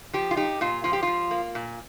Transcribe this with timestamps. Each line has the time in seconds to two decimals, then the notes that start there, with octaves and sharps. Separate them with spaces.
0.13 F3 G4
0.31 F4
0.36 D#4 G4
0.61 A#2 F4
0.84 F3 F4
0.93 G4
1.03 F3 F4
1.31 A#3
1.55 A#2